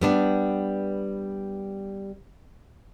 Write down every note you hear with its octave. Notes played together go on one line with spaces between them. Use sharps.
G3 B3 D4